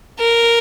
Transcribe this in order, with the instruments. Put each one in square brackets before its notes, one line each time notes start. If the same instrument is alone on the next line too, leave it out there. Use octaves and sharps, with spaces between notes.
[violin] A#4